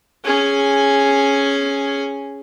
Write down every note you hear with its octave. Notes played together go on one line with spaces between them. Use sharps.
C#4 G#4